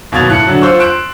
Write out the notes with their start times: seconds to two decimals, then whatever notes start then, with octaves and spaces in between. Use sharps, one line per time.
0.12 D#2 B2 F#3 G#6 A6 F7
0.28 A2 F#6 C#7
0.47 D3 F#3
0.62 F4 C5 C#6 E6
0.79 C6 F#6 D7 E7